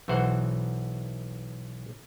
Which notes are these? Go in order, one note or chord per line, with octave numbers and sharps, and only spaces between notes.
B1 E3 F#4 C5 F#5